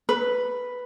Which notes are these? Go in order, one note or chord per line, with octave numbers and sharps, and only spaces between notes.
B4